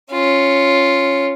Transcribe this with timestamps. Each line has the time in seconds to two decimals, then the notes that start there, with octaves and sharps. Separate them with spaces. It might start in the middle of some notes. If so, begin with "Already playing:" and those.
0.12 C#4 F4